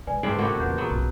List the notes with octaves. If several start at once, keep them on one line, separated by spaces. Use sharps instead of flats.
B2 G#3 B4 D5 G#5
G2 C#3 G3 C4 C7 D7 F#7
A#2 A3 F#4 G4 F#5 B5
E2 B4 F#5 G6
C#3 F#3 B3
B1 G2